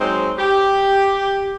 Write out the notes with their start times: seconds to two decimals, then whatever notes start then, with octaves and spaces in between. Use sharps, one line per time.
0.01 F#3 G#3 C4 D#4 C5 C#5
0.38 G4